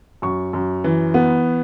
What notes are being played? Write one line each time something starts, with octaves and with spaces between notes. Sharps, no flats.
F#2 C#6
F#2
E3
B3